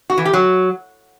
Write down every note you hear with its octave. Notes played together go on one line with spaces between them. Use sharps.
F#4
E3
G4
F#3